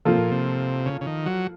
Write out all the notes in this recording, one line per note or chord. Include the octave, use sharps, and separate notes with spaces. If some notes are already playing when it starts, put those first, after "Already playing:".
C3 F3 A#3 F4 A4
A#2
C3
C#3
C#3
D#3
F#3